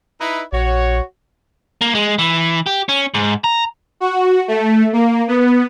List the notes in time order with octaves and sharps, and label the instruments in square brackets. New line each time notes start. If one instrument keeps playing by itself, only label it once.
[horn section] D#4 E4 B4
[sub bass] A#1 [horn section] F#4 C#5
[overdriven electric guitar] A#3
G#3
E3
G4
C#4
G#2
A#5
[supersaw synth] F#4
A3
A#3
B3